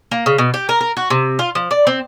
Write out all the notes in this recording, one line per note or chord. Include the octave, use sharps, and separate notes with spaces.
A#3
C#3
B2
G4
A#4
A#4
F#4
C3
F4
F3
D5
C4